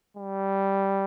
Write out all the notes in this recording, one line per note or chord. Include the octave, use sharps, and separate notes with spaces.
G3